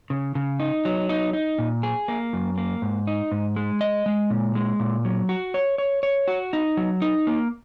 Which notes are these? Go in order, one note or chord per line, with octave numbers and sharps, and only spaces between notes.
C#3
C#3
D#4
F#3
D#4
D#4
A#2
G#4
A#3
F#2
A#3
G#2
D#4
G#2
G#3
D#5
G#3
A#2
G#3
A#2
F#3
F#4
C#5
C#5
C#5
F#4
D#4
F#3
D#4
A#3